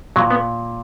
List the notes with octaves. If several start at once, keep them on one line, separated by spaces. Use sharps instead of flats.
A#2 F#3
B3